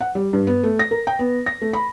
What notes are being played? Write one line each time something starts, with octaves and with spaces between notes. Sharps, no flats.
F#5
G3
G2
B3
A3
A#6
A#4
G5
B3
A#6
A3
B5